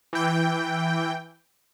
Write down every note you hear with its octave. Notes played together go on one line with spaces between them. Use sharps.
E3 G5